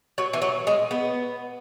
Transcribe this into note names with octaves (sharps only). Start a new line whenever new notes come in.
F#3
E3
F#3
G#3
B3